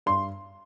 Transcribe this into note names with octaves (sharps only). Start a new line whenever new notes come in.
G2 C6